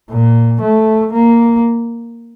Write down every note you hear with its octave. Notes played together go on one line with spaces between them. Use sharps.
A#2
A3
A#3